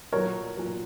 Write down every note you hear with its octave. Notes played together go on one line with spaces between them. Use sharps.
B1 A#2 F#3 A#4 C#5
A#2 F#3